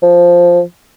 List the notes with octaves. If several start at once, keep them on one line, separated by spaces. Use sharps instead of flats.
F3